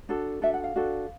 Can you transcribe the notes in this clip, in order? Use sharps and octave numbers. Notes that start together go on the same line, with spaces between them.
D4 F#4 A4
D4 F#4 A4 E5
F#5
F5
D4 F#4 A4